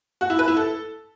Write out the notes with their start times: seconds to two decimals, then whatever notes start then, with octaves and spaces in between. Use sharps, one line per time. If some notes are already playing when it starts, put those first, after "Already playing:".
0.21 F#4
0.30 E4
0.39 B4
0.48 E4
0.57 A4